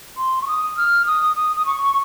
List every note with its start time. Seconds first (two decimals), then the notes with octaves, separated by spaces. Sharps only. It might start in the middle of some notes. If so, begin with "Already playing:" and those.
0.17 C6
0.42 C#6
0.47 D#6
0.77 F6
1.06 D#6
1.36 D#6
1.56 D#6
1.66 C#6